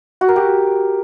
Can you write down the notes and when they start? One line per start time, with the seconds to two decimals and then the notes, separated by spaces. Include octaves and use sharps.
0.21 F#4
0.28 A#4
0.36 G4